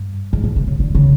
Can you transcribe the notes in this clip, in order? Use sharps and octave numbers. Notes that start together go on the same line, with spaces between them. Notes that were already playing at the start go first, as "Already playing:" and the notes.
Already playing: G2
G#2
B2
C3
C#3
D3
C#3